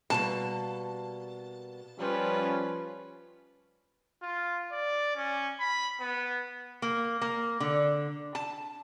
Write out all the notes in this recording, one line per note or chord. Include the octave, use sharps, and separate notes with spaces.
B2 G3 A#3 A5
F3 G3 C#4 F4 B4
F4
D5
C#4
B5
B3
A#3
A#3
D3
A5